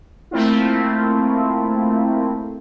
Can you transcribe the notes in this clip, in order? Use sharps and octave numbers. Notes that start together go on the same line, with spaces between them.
A3 A#3 C4 E4 F4